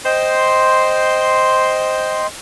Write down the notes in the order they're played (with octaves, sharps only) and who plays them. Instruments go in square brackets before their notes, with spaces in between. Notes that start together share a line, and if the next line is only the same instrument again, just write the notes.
[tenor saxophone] C5 [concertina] D#5 G5 C6